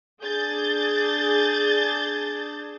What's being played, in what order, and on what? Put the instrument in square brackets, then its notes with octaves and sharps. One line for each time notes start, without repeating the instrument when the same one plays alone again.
[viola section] D4 G#4 [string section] G6 A6